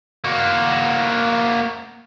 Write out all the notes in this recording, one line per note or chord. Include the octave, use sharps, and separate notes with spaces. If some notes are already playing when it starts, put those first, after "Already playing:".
A#3 F#4